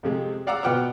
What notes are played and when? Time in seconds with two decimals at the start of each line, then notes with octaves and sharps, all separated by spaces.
0.03 F2 C3 G#3
0.47 D5 F5 F#5 A#5 D6 E6
0.63 B2 B4 F#5 G5 D6 F6